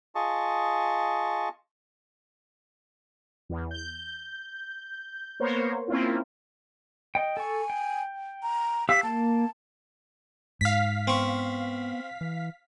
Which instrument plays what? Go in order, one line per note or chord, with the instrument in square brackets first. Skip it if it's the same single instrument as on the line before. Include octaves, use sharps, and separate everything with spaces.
[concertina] F4 G#4 D#5 A5 C#6
[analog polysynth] E2
G6
A#3 B3 A#4 C5 C#5
A#3 C4 C#4 E4 F4
[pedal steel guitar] D#5 G5
[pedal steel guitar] A4 C#6 [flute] G#5
[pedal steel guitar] G5
[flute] A#5
[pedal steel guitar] G4 F5 E6 [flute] B6
[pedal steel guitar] A#3 [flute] A5
[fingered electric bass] G#2 [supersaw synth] F5 B6
[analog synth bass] B3 [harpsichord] C4 C#6
[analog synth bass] E3